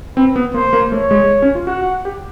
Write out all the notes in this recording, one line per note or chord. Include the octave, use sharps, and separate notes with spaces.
C4 B4
B3
A#3 C5
A#3
A3 C#5
G#3
C#4
F4
F#4 F#5
G4